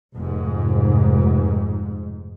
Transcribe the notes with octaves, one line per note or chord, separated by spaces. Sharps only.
F1 G#2